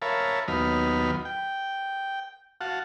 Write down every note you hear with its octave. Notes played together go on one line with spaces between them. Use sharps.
A#4 C#5 E5 F5 A5 B5
D#2 F#3 B3 D#4 B5 F6
G5
F#4 F5 F#5 A5